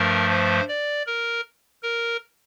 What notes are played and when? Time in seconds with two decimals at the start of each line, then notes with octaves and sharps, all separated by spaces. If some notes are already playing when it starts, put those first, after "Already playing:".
Already playing: G2 F3 A3 A#4
0.30 C5
0.68 D5
1.06 A#4
1.82 A#4